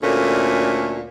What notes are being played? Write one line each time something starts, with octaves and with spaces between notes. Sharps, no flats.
D2 A#2 A3 C#4